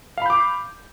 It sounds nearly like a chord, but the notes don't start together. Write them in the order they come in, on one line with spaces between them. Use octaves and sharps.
F5 B5 G6 D6